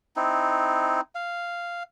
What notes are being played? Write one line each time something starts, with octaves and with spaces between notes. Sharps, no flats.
C4 D#4 E4
F5